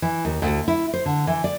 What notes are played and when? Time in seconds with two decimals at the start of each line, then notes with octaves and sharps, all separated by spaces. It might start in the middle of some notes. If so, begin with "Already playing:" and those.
0.02 E3
0.25 D#2
0.42 D2
0.68 E4
0.93 C5
1.06 D3
1.27 E3
1.44 D5